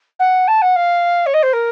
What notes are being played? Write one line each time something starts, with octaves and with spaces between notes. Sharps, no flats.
F#5
A5
F#5
F5
C#5
D#5
C5
A#4